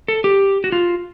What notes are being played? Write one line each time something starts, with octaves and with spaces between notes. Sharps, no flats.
A4
G4
F#4
F4